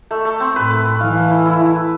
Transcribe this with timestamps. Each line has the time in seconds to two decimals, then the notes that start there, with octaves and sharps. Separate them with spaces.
0.11 A3
0.25 A3
0.40 C4
0.55 A2 B4
0.70 B4
0.85 B4
1.00 E3 F5
1.15 F5
1.31 E4
1.46 E4
1.61 E4
1.76 B4